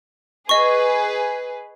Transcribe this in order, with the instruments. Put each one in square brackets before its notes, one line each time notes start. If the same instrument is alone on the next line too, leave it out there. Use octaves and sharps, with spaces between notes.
[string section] G#4 B4 [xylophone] D#5 C#6